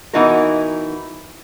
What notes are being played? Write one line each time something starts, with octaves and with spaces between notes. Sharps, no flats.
E3 B3 D#4 E4 F#4 A#4